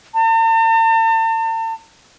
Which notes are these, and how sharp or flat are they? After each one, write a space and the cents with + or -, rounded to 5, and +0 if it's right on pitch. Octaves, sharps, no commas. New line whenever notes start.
A5 +45